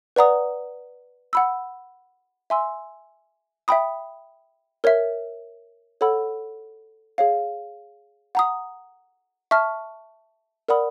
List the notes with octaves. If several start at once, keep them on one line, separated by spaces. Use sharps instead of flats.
B4 D5 F#5 A#5 D#6
F#5 B5 E6
E5 G#5 C6 E6
E5 G5 B5 D#6
A#4 C#5 E5
A4 C#5 F#5 B5 E6
G#4 C#5 F5
F#5 A#5 D#6
E5 A5 C#6 F6
A#4 D5 F#5 B5 D#6